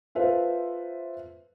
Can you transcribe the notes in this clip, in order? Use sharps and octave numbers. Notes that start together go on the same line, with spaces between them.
F4 A4 B4 C5 E5